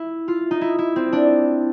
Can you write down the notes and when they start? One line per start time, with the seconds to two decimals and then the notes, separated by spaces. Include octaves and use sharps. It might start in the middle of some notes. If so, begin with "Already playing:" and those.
Already playing: E4
0.28 F4
0.51 D#4
0.61 E4
0.79 E4
0.96 C4
1.13 D4